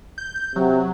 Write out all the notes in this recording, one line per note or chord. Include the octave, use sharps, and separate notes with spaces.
G6
C3 F#3